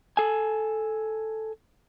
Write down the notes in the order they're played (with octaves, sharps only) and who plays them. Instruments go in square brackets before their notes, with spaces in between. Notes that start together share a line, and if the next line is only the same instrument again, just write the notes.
[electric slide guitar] A4 G#5